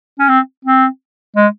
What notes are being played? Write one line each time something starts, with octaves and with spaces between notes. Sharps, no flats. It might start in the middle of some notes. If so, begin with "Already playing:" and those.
C#4
C4
C4
G#3